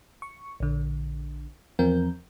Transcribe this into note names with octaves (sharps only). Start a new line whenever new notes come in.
C#6
A#1 D3
E2 F3 C4 A#4 G6